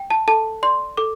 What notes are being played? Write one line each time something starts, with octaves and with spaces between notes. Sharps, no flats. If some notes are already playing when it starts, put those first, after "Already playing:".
Already playing: G5
A5
A4 A5
D5 C6
A4 D6